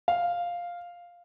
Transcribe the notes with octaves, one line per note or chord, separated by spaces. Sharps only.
F5